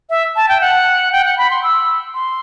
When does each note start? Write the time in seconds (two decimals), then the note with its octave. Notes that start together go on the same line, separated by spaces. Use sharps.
0.10 E5
0.36 A5
0.49 G5
0.61 F#5
1.12 G5
1.25 F#5
1.38 B5
1.50 C6
1.63 E6
2.14 C6